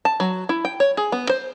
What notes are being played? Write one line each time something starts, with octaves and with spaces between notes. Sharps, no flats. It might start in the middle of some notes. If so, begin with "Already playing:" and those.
A5
F#3
E4
G5
C#5
G#4
B3
C5